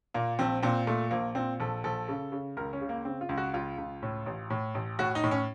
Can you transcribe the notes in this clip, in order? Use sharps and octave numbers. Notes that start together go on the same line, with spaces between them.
A#2 A#3
A#1 C4
A#2 C4
A#2 A3
A#1 A#3
A#2 C4
A#1 A4
A#1 A4
C#3
C#3
C#2 A#4
C#4
C#3
A#3
C#3 C4
F4
C#2
F#4
C#2 F4
C#2
A2
A1
A2
A1
A2 F#4
D#4
A2
C#4